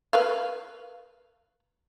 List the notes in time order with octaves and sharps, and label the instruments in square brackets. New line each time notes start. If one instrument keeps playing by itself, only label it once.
[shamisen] A#4 B4 F5